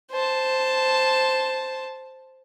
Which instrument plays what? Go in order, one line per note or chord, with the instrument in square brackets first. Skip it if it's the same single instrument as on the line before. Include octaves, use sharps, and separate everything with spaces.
[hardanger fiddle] C5 A5